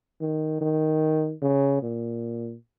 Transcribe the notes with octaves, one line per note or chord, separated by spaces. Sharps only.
D#3
D#3
C#3
A#2